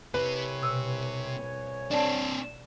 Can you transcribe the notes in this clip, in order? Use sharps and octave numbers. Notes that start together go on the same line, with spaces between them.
C2 C3 B4 C#5 G#5
B2 E6
C4 D4 D5 A5